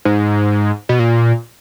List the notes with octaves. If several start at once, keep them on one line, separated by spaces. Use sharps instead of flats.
G#2
B2
A#2